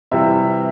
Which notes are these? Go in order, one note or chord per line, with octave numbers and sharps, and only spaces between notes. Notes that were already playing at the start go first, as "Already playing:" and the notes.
C3 E3 G3 E5